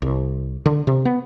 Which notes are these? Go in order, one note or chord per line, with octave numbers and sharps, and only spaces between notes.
C2
D3
C3
B3